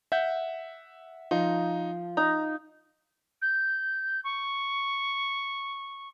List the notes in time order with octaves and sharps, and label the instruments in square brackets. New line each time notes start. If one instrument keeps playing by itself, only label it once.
[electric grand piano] E5 F#5 G6
[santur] F3 [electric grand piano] D#4
[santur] D#4 [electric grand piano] A#5
[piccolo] G6
C#6